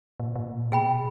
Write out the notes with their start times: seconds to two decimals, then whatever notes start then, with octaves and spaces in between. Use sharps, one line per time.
0.20 A#2
0.36 A#2
0.72 B2 G#4 G5 B5